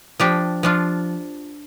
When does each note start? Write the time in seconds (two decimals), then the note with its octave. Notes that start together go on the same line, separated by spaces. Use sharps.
0.20 F3 D4 G4
0.63 F3 D4 F4